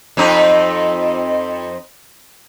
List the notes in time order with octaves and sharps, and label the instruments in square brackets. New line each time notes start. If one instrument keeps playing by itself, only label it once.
[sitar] F2 C4 D#4